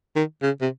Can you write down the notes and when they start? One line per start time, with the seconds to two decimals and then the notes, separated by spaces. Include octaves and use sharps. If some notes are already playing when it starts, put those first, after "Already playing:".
0.16 D#3
0.43 C#3
0.62 C3